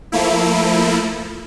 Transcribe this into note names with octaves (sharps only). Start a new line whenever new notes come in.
F3 A3 A#3 E4